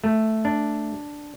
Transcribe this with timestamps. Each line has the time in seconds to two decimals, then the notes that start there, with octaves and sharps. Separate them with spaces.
0.04 A3
0.45 D4